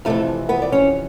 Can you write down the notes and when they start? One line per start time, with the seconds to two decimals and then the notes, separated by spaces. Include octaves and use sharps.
0.05 F2 C3 E3 A3 A4
0.49 B3 B4
0.62 D5
0.72 C#4 C#5